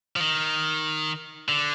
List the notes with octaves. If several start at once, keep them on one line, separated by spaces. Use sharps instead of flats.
F3
D#3
D3